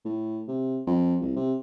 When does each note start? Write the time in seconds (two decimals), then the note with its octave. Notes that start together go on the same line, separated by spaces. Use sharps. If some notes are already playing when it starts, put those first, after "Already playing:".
0.05 A2
0.48 C3
0.87 F2
1.21 C2
1.36 C3